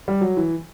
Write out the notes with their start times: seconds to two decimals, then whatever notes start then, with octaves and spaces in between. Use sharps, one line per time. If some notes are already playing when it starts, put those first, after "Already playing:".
0.08 G3
0.21 F#3
0.37 E3